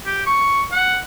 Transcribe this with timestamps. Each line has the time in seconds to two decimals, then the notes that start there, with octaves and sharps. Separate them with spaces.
0.06 G4
0.26 C#6
0.72 F#5